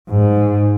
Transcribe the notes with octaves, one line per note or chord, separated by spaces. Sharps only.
G#2